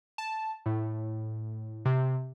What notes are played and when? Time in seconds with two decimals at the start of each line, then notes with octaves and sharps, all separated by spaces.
0.18 A5
0.66 A2
1.85 C3